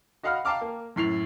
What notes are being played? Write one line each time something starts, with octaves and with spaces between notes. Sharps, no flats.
F#4 D#5 F5 F#5 B5 F6
F5 G5 A5 A#5 D6 F6
A#3
F#2 A2 C7 F7